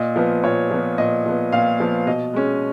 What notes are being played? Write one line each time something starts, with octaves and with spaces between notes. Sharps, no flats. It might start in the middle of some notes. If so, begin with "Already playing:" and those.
Already playing: A#2 D#5
F3 B3
A#2 C#5
F3 B3
A#2 D#5
F3 B3
A#2 F5
F3 B3
B2 D#5
G#3 C#4